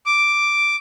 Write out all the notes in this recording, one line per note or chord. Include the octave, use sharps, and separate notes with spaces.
D6